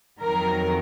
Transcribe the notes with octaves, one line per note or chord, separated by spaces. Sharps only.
F2 D#3 F#3 A#4